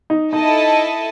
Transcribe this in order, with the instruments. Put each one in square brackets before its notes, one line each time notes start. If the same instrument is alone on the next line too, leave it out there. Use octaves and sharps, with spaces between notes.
[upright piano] D#4
[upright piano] D#4 [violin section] E4 A4 D#5 A5